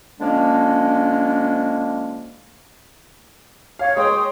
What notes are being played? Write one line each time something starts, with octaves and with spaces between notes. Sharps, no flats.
D3 F3 G#3 A#3 C#4 D4
C#5 F5
G#3 C#5 G5 C6 D#6